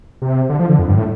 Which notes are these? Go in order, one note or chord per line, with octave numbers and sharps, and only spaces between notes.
C3
D3
F3
D3
F2
G2
A2